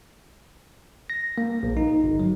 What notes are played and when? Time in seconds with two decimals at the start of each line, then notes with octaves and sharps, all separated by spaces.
1.10 A#6
1.38 A#3
1.63 A#1
1.77 D#4
2.04 G1
2.20 F#3